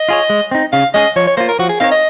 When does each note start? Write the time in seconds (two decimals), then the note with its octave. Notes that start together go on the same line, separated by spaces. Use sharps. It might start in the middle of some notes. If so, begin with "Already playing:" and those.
Already playing: D#5
0.09 F4 G#4 C#5
0.30 G#3
0.51 C4 D#4
0.73 C#3 F5
0.94 G#3 C#4 G#4 D#5
1.16 F3 C#5
1.27 C#5
1.37 A#3 F4 C5
1.48 A#4
1.59 F3 F#4
1.69 G#4
1.80 C4 D#4 A#4 C#5 F5
1.92 D#5